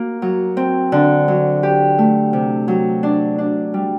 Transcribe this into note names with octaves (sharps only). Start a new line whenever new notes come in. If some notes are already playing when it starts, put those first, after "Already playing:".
Already playing: A#3 F#4
F#3
C4
D3
F#3
G4
A3
C3
F#3
D4
D4
G3